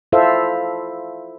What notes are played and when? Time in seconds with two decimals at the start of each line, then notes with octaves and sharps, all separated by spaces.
0.12 E4 F4 A4 C5 E5 F5